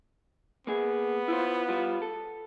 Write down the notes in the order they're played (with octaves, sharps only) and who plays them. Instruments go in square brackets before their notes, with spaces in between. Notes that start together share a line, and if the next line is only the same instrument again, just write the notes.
[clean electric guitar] A#3 G#4 [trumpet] B3
[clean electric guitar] E4 F4 C5
G3 F4
A4